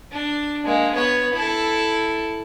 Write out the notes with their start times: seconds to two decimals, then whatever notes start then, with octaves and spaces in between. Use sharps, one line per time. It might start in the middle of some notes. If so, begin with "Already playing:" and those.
0.12 D4
0.65 G#3 A#3
0.94 B3 C#5
1.33 E4 A4